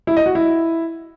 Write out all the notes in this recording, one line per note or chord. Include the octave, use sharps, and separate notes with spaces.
E4
D#5
F#4
E4